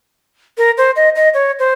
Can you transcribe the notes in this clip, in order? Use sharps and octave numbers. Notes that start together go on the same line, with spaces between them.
A#4
C5
D#5
D#5
C#5
C5